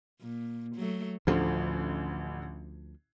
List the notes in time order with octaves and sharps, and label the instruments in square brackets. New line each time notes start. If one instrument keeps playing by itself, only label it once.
[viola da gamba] A#2
F#3 A3
[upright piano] A1 D3 [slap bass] D2 F3